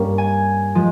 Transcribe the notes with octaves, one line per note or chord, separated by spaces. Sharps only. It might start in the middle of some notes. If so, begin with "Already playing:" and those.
Already playing: G2 G3 A#3 C#4
G#5
F3 G#3